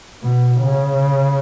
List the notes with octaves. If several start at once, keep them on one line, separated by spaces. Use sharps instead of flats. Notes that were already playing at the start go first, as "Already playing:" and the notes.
B2
C#3